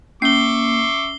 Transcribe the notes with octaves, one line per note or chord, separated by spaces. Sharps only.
A#3 C#4 E5 C#6 D6 C7 G7